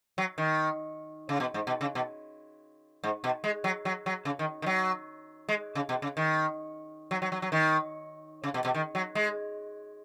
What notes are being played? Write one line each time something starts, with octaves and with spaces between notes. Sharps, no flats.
F#3
D#3
C#3
B2
G#2
B2
C#3
B2
G#2
B2
G#3
F#3
F#3
F#3
C#3
D#3
D#3
F#3
G#3
C#3
B2
C#3
D#3
F#3
F#3
F#3
F#3
D#3
C#3
B2
B2
D#3
F#3
G#3